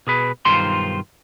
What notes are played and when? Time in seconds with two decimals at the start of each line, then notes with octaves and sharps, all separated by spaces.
0.07 B2 G#4 B4
0.45 B1 G2 D#3 F4 C5 C6